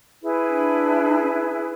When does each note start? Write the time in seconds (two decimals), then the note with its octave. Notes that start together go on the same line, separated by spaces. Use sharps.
0.22 E4 G#4 B4
0.48 D4